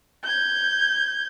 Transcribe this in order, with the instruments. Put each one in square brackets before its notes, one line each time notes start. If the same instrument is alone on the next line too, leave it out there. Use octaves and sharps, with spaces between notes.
[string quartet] G6 G#6